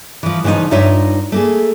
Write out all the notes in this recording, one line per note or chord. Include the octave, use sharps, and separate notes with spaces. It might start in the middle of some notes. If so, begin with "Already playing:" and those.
E3 F3
C#3 E3 F3 D4 D#4
G2 D#4 F4 C#5 E5
A3 A#3 G#4